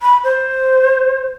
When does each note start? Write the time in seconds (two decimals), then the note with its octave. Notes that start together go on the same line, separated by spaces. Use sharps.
0.02 B5
0.24 C5